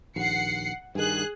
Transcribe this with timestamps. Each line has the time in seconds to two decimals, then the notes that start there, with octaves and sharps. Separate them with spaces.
0.16 A#1 D#2 F#5 C7 C#7
0.95 G2 D#3 G#4 F#6